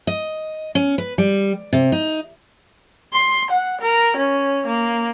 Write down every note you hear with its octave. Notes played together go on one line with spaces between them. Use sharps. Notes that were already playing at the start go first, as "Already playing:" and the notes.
D#5
C#4
B4
G3
C3
D#4
C6
F#5
A#4
C#4
A#3